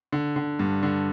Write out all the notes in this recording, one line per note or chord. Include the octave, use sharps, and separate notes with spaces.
D3
D3
G2
D3